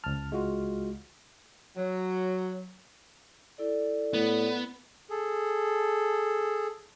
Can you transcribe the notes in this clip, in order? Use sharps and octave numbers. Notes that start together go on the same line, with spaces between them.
C#2 A5 F6
G#3 F4 F#4
F#3
E4 A4 D5
A2 B3
G#4 A4